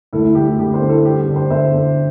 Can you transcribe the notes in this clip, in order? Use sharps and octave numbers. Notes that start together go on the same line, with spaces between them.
D2 E4 A4
E4
D2 G4
E4
D3 G4
G4 C5
D3
E4 A4
G2 G4
G4
D3
G4 C5
D3 C5 E5
D3